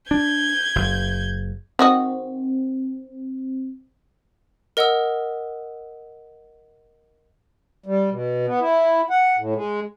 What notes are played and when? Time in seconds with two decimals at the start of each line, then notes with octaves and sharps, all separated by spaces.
0.11 D4 G6 G#6
0.76 F#1
1.79 D#3 C4 F#4 D#5
4.77 A#4 D#5 F#5 D#6 E6
7.86 G3
8.10 B2
8.47 B3
8.60 E4
9.10 F#5
9.38 A2
9.55 G#3